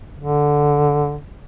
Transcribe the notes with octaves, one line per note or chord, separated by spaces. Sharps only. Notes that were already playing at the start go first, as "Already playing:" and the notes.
D3